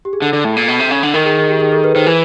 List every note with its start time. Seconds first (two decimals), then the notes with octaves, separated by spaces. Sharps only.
0.05 G4
0.13 G#4
0.22 D3 A4
0.33 D3
0.44 A2
0.57 A#2
0.68 B2
0.80 C3
0.91 C#3
1.03 D3
1.14 D#3 A#4
1.25 G#4
1.37 G#4
1.49 G4
1.60 G#4
1.72 A4
1.84 B4
1.95 D#3 C5
2.07 E3 B4